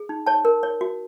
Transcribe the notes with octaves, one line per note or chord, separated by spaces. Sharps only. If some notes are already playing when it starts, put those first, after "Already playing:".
Already playing: G#4
D#4
C#5 A5
A#4
C#5
F#4